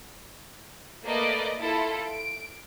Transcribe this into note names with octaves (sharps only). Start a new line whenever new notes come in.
A3 A#3 B4 D5 D#5 D6
E4 F4 A4
D7